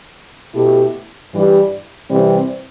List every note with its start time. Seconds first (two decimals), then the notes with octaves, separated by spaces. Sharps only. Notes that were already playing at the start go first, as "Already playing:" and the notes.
0.55 B2 A3 E4 G4
1.32 G2 E3 G3
2.10 C3 E3 G3 C4